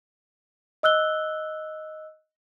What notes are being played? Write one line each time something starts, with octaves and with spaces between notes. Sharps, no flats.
D#5 E6 F#6 G7